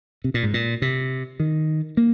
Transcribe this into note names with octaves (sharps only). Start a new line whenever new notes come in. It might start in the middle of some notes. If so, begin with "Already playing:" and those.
C3
A#2
G#2
A#2
C3
D#3
A#3